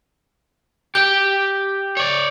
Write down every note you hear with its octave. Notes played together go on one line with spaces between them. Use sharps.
G4 G5 G6
C#5 D5